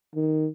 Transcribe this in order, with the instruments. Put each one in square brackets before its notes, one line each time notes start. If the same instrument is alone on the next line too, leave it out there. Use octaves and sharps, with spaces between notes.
[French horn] D#3